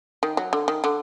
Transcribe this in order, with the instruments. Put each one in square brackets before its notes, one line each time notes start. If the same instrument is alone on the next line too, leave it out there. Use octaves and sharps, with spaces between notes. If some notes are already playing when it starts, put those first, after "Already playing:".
[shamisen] D#3
F#3
D3
D#3
D3